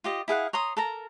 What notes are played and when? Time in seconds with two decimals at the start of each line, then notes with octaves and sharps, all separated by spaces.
0.04 F4 G4 D#5
0.28 E4 G#4 F5 F#5
0.53 C#5 A#5 C6 D#6
0.77 A4 A#4 A#5